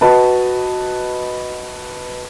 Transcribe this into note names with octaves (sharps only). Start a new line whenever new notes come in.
F#4 B4 D#5 A5